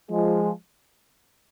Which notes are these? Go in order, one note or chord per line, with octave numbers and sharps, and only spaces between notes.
F3 G#3